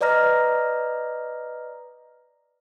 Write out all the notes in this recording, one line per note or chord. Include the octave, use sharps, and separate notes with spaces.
B4 D5 D#5 A#5 F6 A#6